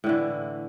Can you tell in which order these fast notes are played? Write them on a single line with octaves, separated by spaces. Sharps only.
A2 D3 E3